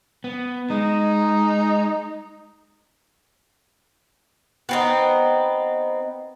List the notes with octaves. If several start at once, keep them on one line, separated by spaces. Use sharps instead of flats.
B3
G#3 D#4
B3 C4 D#4